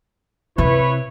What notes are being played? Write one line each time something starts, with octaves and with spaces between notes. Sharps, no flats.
C3 E4 B4 C#5